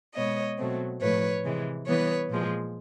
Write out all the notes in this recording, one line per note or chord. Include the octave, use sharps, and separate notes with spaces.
B2 G#3 B3 C#5 D#5
B2 F#3 A3 C4
A2 F3 A3 B4 C#5
C3 E3 G#3
E3 G3 B3 B4 C#5
A#2 F3 G#3